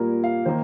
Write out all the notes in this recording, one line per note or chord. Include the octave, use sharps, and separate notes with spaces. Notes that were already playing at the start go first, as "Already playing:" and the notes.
Already playing: A#2 G3 A#3 A#4
F5
D#3 A#3 C5